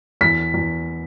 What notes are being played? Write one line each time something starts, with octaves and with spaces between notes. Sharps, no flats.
E2 B6
E2